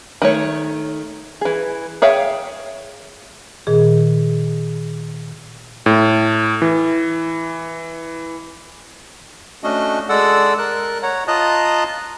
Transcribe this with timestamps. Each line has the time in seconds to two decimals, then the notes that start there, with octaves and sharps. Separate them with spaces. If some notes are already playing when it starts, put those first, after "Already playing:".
0.22 D#3 A3 C#5
1.41 E3 G#4
2.02 G#4 C#5 E5 F5 G5
3.67 A#2 D#3 G#4
5.86 A2
6.62 E3
9.64 A3 C#4 D4 F#4 D#5
10.09 G#3 A4 D5 F#5 E6
10.58 A#4 F#6
11.03 C#5 F#5 A#5
11.28 F4 D#5 A5 A#5 D#6 F#6